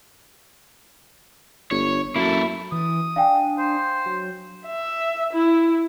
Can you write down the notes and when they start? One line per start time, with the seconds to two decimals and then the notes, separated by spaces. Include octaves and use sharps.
1.71 G1 C#5
2.16 F#2 A#3 E4 A4
2.72 E3 D#6
3.16 D4 F5 G5 G#5
3.59 C5
4.06 F#3
4.66 E5
5.33 E4